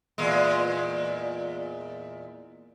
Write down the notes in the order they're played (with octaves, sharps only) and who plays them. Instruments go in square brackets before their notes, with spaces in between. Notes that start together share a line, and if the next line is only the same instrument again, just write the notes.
[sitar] E2 A#2 G#3